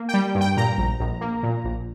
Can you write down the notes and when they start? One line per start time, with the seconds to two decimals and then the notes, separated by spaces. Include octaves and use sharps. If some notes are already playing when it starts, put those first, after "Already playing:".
Already playing: A#3
0.09 G5
0.14 G3
0.35 G2
0.41 G5
0.57 A#2 A#5
0.78 A#1
1.00 A#1
1.21 A#3
1.43 A#2
1.64 A#1